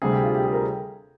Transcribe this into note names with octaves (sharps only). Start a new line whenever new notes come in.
D2 C3 G3 G#4
G4
F4
G4
G#4
A#4